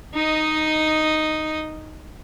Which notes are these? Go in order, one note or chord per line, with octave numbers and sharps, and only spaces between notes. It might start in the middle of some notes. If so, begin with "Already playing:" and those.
D#4 D#5